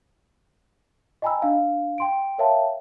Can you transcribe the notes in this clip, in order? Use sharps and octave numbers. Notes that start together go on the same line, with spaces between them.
D#5 G5 G#5 A#5 B5 E6
D4 F5
G5 C6 D7
A#4 C#5 E5 F5 G5 A5